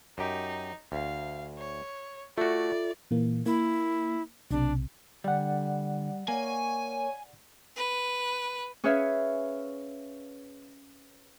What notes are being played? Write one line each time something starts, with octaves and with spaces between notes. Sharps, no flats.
F#2 D#4 G4
D2 F5
C#5
A3 F4 F#4 A4 D5 E5
A#2 E3 A#3
A#3 E4
B1 C3 D4
D3 G3 D5 F#5
A#3 C#5 G#5
B4
C#4 G#4 B4 C#5 E5 F5